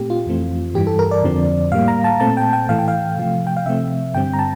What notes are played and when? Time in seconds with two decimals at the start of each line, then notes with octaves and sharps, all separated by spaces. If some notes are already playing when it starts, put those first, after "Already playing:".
Already playing: A#2 A3 C4 G4
0.10 F4
0.26 F2 E3 A3 C4
0.74 G2 E3 G3 G4
0.87 A4
0.99 A#4
1.11 D5
1.23 F2 D3 F3 C4
1.72 A2 G3 A#3 F5
1.88 A#5
2.04 A5
2.20 A#2 A3 C4 A5
2.37 G5
2.53 G5
2.69 A2 E3 A3 F5
2.79 G5
2.88 F5
3.17 C3 F3 A3
3.47 G5
3.57 F5
3.66 C3 F3 A3 C4 E5
4.15 G2 D3 G3 C4 G5
4.34 A#5
4.39 A5